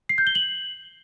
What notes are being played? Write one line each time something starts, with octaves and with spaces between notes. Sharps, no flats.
C7
G6
G7
F#7